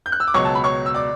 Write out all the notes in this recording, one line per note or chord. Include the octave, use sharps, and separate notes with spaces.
G6
F#6
E6
D6
C#2 B2 F#3 C#5 C#6
A5
B5
C#5 C#6
E6
D5 D6